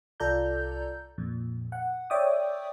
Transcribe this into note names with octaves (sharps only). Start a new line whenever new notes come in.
C2 F4 A4 D5 A#5 G6
F2 A#2
F#5
C#5 D5 E5 G5 D6 D#6